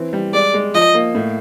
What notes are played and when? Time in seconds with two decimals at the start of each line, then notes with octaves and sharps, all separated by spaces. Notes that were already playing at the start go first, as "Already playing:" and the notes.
Already playing: E3 C4
0.13 G3
0.33 G#3 D5
0.54 G#3
0.74 F3 D#5
0.95 A#3
1.15 A2